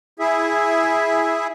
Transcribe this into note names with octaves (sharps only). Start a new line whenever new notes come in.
E4 G#4 E5